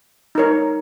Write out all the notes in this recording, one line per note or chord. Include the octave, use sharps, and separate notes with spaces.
D#4 A#4 C#5